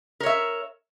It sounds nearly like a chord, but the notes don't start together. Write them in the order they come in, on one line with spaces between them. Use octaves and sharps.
A#4 C#5 E5